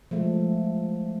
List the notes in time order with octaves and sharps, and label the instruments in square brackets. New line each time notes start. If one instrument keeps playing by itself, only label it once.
[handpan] F3 G#3 A3